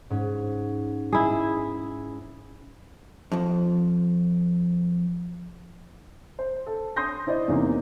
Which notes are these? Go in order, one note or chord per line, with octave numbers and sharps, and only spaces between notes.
G#2 C#4
E4 G#4
F2 F3
C5
A4
C6 D#6 G6 A#6
E4 C5 D5 D#5
E2 C3 E3 A#3 C#4 D#4